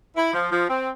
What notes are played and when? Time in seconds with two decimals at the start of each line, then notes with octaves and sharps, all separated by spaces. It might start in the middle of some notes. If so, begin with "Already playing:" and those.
0.17 E4
0.34 F3
0.51 F3
0.69 C4